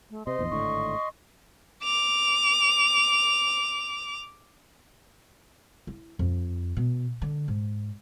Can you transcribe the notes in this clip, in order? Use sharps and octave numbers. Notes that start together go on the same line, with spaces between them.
A3
C3 C5 D#5 C6
A#1 E2
G#1 A2 D3 C#6
D6 F7
E4
F2
B2
D3
G#2